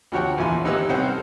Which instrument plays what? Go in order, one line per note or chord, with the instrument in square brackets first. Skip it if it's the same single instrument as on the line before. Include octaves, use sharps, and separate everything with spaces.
[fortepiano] D2 F3 F#4 C#5 F#5 G5
A#1 E2 F3 B3 G#5 C6
G#1 D#2 D#4 G4 B4 E6
C2 C4 C#4 C5 F#5 G5
A4 C5 F6